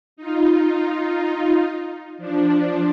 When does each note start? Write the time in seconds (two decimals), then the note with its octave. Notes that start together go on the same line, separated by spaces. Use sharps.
0.17 D#4 F4
2.18 F3 D4